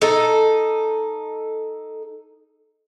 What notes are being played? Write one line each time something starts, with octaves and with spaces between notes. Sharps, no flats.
D#4 A4